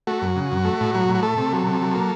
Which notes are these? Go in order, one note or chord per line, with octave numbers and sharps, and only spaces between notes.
A3 F#4
F#2
C#3
F#2
A3
A2
F#3
A2
F#4
A3 A4
C3
F#3
C3
F#3
A#3